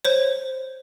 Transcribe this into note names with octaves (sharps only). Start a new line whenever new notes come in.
C5 C#5